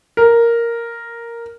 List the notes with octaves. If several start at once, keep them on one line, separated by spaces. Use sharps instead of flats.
A#4